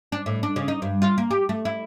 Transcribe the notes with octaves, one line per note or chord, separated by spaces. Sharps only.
D4
A2
D4
C#3
D#4
G2
F4
A#3
G4
A3
E4